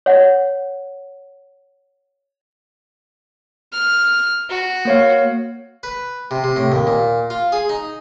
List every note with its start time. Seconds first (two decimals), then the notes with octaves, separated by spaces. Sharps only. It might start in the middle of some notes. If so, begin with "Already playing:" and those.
0.06 C#5 F#5
3.73 F6
4.49 F#4
4.85 A#3 C#5 F5
5.83 B4
6.31 C3
6.44 C3
6.56 A2
6.72 D#2
6.87 A#2
7.30 F4
7.52 G#4
7.69 D#4